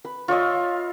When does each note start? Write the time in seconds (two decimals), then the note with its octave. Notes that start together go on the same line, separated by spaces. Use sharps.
0.05 B4
0.28 F4 C#5 D#5 E5